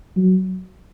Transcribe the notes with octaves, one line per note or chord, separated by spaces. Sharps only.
F#3